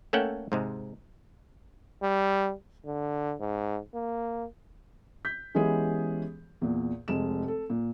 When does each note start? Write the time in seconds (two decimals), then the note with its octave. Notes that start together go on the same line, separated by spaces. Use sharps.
0.13 A3 A#3 C#4 A4 F#5 G5
0.52 G#2 C3 G#3
2.02 G3
2.85 D3
3.40 G#2
3.94 A#3
5.25 G6 B6
5.54 E3 G#3 B3 C#4 G4 G#4
6.61 E2 A#2
7.08 F1 G#3 E7
7.48 A4
7.70 A#2